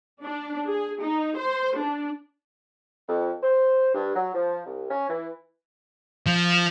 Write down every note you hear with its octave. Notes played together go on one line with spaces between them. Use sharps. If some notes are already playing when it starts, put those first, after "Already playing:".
D4
G#4
D#4
C5
D4
F2
C5
G2
F#3
F3
C2
C#4
E3
F3